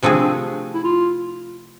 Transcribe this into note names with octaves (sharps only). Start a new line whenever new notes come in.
C3 F3 A3 C4 D4 G#4
E4
F4